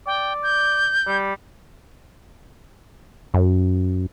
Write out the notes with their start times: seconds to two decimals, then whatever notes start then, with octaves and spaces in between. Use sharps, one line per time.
0.07 D5 G5
0.43 G6
1.07 G3
3.34 F#2